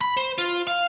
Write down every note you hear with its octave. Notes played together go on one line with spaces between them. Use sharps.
B5
C5
F4
F5